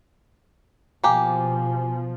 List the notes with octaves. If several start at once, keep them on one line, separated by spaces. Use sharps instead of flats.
B2 F3 A#3 G4 G#5